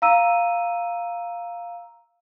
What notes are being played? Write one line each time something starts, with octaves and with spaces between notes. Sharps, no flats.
F5 A#5 E6 D#7